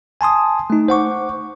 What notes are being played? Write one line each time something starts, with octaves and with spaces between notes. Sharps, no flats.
G#5 A5 C6 D#6
A3 D#4
C5 F#5 C#6 D6